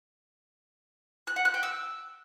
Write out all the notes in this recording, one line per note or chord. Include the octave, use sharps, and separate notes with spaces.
F#6
F#5
F#6
G5
E6